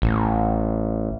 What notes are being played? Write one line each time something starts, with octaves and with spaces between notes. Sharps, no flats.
A1